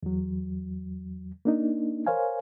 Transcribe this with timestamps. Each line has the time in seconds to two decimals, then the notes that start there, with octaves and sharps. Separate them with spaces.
0.03 E2 F#3
1.45 A#3 D4 D#4
2.07 A#4 C5 C#5 F5 G#5